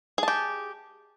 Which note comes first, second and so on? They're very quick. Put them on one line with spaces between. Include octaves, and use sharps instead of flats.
G#4 A5 G4